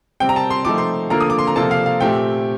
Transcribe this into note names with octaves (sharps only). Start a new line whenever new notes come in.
C3 G3 C4 G5
A#5
A5
C6
F3 A3 D#4 A4 D6
C6
D3 F3 A#3 F4 A4 A#5
D#6
D6
C6
A#5
C3 F3 A#3 F4 A4 A5
F5
F5
A#2 A3 C4 G4 G5